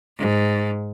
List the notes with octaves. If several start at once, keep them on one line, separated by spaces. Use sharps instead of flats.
G#2